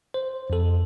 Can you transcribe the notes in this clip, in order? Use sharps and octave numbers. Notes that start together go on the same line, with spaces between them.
C5
F2 A4